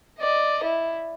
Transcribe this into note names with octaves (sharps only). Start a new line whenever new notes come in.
D5 D#5
E4